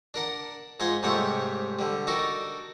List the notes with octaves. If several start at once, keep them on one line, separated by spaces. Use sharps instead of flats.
D4 A#4 F#5
G#2 F4 D#5 F#5 G#5
G#2 C3 G3 A3 C#5 F#5
D3 G3
D4 D#4 F#4 A4 A#4